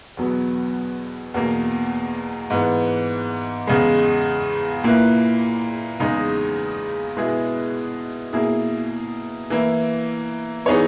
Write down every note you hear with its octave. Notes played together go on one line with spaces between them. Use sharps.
E2 B2 F#3 B3
E2 B2 A#3
G#2 E3 B3
E2 C#3 G#3
A#2 A#3 E4 B4
E2 C#3 G#3 D#4
B2 G#3 B3 E4 G#4
B2 A#3 E4 G#4
E3 A#3 E4
E3 B3 D#4 G#4 C#5